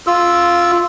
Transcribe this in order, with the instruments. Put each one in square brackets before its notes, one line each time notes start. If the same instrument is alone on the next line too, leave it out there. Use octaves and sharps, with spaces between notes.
[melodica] F4 E6